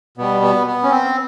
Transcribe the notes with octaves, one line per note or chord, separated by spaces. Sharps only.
B2 G3 B3
B3
B3
C#4
C4